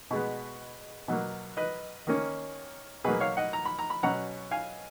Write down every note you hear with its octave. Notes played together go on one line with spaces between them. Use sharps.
B2 G#3 B3
B2 F#3 A#3
B4 D#5
D#3 A#3 C#4
B2 F#3 A#3 G#4 B4
C#5 F5
D#5 F#5
A#5
B5
A#5
B5
B2 F#3 C#4 F#5 A#5
F5 G#5